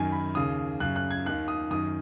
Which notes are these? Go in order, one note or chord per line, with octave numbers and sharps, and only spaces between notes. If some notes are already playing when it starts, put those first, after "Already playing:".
Already playing: F#2 D#3 G#5
B5
D#2 C#3 D#6
F#2 C#3 F#6
F#6
G#6
D#2 D#3 F#6
D#6
F#2 D#3 D#6